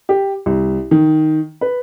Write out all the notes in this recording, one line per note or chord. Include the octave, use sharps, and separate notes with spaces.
G4
C2
D#3
B4